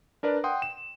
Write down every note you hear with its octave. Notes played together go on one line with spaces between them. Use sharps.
D4 A#4 B4 D5
F#5 G5 C6 D#6
E7